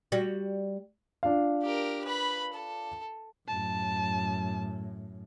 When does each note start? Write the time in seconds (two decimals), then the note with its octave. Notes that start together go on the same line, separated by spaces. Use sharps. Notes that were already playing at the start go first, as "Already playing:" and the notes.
0.12 G3 F#4
1.23 D4 F4 F5
1.63 G4 A#4
2.05 B4 B5
2.53 A4
3.48 F#2 A2 A5